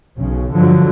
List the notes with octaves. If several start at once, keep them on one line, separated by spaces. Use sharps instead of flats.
B1 C#3
G2 D3 F3 F#3